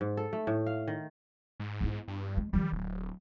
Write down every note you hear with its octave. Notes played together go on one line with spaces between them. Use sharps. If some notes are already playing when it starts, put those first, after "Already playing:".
G#2
A4
A3
A2
F5
D#3
G#2
B3 E4
G2
G#3
D#3 F3 G3
D1 F#3